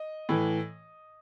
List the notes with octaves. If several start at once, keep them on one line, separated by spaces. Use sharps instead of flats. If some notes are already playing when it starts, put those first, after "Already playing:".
Already playing: D#5
A2 E3